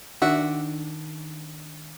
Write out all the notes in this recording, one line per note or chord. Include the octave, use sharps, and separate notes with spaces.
D#3 D4 F#4 E5 F#5